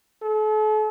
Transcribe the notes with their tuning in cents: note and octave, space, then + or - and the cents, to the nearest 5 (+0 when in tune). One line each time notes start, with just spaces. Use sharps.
A4 -40